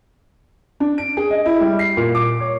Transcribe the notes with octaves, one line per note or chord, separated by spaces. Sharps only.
D4
D7
G#4
D#5
E4
G3
C7
A#2
D6
C#5